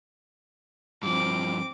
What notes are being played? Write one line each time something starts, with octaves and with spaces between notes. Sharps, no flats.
G2 F3 C4 D6